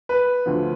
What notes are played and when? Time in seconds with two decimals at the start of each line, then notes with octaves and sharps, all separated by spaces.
0.09 B4
0.46 D2 D3 F3